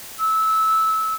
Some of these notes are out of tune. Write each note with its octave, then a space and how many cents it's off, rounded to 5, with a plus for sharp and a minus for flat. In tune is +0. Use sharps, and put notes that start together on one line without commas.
E6 -20